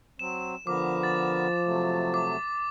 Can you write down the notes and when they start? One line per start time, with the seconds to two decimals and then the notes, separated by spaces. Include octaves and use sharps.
0.19 F#3 C4 E7
0.67 D3 F3 B3 A#4 D6
1.03 A6
1.66 C3 F#3 A3
2.14 D6